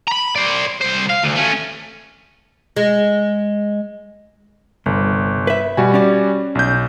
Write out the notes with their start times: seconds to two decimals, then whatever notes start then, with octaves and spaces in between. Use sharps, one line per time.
0.07 A#5 B5
0.36 C5 D5
0.81 C2 C5
1.10 F5
1.24 D2
1.36 A3 C#4
2.77 G#3
4.86 G1 C2
5.47 B4 E5
5.77 B2 G3 F#4 G#5
5.94 C#4 D5
6.55 B1 G6